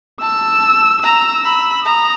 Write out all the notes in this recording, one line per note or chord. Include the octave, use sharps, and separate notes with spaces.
A5 E6
A#5 E6
B5
A#5 D#6